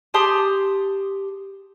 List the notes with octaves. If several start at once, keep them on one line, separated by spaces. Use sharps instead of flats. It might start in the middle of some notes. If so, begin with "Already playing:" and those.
G4 A5 C6 D#6